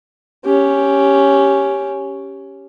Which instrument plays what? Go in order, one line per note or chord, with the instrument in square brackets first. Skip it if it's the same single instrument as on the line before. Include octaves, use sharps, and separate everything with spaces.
[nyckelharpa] C#4 G4